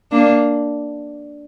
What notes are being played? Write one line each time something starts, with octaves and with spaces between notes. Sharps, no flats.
A#3 D4